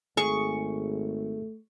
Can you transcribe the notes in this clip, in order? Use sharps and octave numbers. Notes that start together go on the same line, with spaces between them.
G#1 A3 G#4 C#6